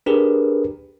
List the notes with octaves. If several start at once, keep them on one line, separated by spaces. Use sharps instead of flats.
D4 G4 G#4 A#4 B4